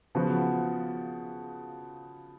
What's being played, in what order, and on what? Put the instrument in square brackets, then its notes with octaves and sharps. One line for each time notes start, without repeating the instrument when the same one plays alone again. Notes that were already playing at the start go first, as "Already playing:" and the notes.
[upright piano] C#3 F3 B3 F#4